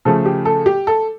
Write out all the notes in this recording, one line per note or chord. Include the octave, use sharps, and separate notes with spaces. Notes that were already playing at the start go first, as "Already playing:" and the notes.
C#3 F3 A3 A4
G4
A4
G4
A4